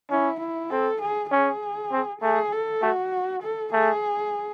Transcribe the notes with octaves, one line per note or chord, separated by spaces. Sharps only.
C#4 E4
E4
C4 A4
G#4
C#4 G#4
C4
A3 G#4
A4
A3 F#4
A4
A3 G#4